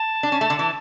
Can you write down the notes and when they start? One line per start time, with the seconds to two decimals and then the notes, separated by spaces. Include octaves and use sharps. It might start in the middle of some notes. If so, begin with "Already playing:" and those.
Already playing: A5
0.23 D4
0.32 C#4
0.41 A3
0.50 D3
0.59 E3